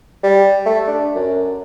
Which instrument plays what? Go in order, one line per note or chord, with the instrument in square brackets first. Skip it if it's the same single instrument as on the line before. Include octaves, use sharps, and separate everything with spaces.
[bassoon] G3
A3
D4
F#2